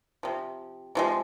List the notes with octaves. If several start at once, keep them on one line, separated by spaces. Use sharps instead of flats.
C3 F3
C3 F3 G#3